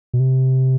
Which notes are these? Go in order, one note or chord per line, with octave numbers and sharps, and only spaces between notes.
B2
C3